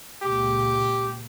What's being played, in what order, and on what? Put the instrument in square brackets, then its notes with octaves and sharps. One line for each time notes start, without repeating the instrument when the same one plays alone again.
[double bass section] C#2 A#2 [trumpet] G4